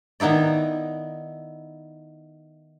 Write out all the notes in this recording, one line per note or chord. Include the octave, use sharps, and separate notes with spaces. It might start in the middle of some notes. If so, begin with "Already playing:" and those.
D#3 B3 D#4 E4 D5